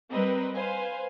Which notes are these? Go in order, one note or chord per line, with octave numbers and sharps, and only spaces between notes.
G3 C4 A#4 B4 D#5
B4 C5 F5 G#5